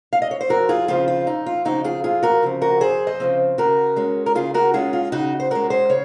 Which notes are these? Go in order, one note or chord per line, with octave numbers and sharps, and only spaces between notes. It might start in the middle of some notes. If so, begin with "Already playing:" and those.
F5
D#5
C#5
C5
F2 F#4 A#4
F4 G#4
C#3 F3 C4 F4
F4
F2 D#4
F4
C#3 F3 C4 D#4 F#4
F4 G#4
F2 F4 G#4
F#4 A#4
C#3 F3 C4
F#4 A#4
F2 G#4 C5
C5 D#5
C#3 F3 C4
C#3 F#4 A#4
G#3 C#4
A#4
C#3 F4 G#4
F#4 A#4
G#3 C#4 F4 G#4
F4
C#3 D#4 F#4
C5
G#3 C#4 F#4 A#4
G#4 C5
C#3 C#5